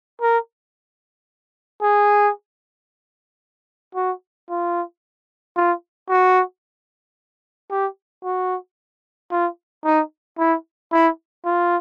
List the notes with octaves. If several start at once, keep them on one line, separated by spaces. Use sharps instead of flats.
A#4
G#4
F#4
F4
F4
F#4
G4
F#4
F4
D#4
E4
E4
F4